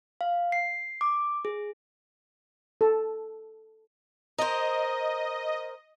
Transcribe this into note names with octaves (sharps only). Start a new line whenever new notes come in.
F5
C7
D6
G#4
A4
A#4 C5 D#5